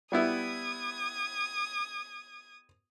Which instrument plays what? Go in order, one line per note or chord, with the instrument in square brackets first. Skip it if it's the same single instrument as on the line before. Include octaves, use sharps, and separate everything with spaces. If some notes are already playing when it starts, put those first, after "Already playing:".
[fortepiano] G3 B3 E4 [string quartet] D#6 G#6